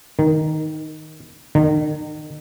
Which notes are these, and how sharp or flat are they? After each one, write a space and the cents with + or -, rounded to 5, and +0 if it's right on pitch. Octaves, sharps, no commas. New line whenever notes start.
D#3 +0
D#3 -35